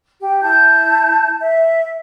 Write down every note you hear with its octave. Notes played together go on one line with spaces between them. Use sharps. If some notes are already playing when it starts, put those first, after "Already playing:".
G4
E4 A5 G6
E5